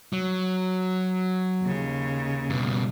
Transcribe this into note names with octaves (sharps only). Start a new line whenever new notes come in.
F#3
D#2 C#3
G2 B2